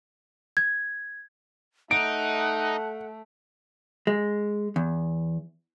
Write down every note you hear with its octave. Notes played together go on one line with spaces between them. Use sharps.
G#6
A3 D#4 F#5 D7
G#3
E2